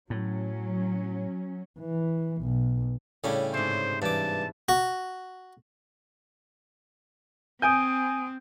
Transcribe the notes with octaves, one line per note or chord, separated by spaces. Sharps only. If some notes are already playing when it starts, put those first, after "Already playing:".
A2 F#3 C#4
E3
B1
A2 C#3 G3 C#4 D4 E4
G#2 C3 C5
G2 E3 A5 D6
F#4
C4 G#5 D#6 G6 D7 D#7